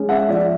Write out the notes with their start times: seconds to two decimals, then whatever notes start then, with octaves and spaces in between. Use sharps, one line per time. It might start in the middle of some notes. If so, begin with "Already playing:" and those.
Already playing: G#3 C#4
0.09 E5 F#5
0.29 F3 D5 E5